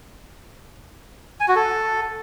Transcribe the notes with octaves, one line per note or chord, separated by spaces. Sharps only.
G#5
F#4
A4